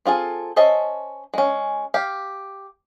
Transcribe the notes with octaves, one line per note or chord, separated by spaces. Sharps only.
C4 F4 G#4 A4
C#4 C5 D#5 E5 A5
G#3 C#4
G4 F5